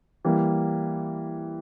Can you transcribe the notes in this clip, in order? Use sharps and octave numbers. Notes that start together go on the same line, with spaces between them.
E3 G3 A#3